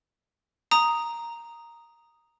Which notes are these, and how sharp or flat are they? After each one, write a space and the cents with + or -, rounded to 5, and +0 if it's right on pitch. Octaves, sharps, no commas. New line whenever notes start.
A#5 +0 D#6 +0